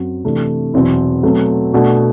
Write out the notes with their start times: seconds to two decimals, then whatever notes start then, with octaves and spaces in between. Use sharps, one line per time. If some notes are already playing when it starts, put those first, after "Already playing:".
Already playing: F#2 F#3 C4 F#4
0.24 C3 E3 A3 D4
0.73 E2 B2 F#3 C4 E4
1.23 B2 F#3 A3 C4
1.73 B2 A3 D4 F#4